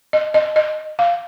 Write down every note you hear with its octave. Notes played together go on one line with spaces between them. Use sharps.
D#5
D#5
D#5
F5